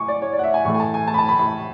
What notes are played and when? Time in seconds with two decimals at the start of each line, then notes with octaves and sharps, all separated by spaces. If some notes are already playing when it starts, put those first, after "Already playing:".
Already playing: G#5 C#6 D6
0.08 D5
0.22 C#5
0.33 D5
0.39 F#5
0.44 E5
0.54 G#5
0.65 A2 E3 A3 C#6
0.74 G#5
0.80 A5
0.94 G#5
1.07 A5
1.14 B5
1.18 A5
1.29 B5
1.39 B5